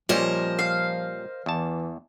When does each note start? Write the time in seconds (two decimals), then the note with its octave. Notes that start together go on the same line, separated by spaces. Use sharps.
0.09 A#2 F3 G3 C#4 A#4 C5 D#5
0.59 F5
1.46 E2 E3 A5